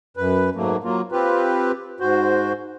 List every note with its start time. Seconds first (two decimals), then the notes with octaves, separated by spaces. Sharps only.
0.17 F#2 B4
0.55 G#2 F#3 A3 A#3
0.84 F#3 A#3 F4
1.12 C4 F4 G4 B4
2.00 G#2 F#4 C5